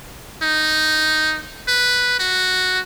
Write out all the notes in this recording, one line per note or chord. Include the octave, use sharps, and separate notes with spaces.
D#4
B4
F#4